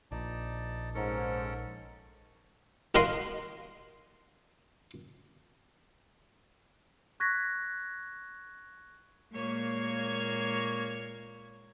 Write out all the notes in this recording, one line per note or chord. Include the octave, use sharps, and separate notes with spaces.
A#1 D#4 D5 A5
G#2 C#4 A4 A#4
E4 F#4 A#4 D#5 F5 C6
C#6 F#6 G#6 A#6 B6
A#2 G#3 A#3 C#5 C#6 G#6